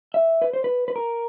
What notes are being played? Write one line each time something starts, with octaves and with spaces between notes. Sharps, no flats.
E5
B4
C5
B4
B4
A#4